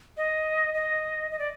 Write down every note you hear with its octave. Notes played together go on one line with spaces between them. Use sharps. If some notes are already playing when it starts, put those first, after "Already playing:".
D#5
D#5
D#5
D5